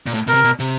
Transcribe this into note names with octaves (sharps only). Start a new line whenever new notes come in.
A#2
A2
B2 A#4
C3
B2
C3